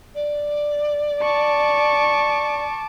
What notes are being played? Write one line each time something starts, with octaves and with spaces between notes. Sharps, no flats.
D5
A5 C#6 D6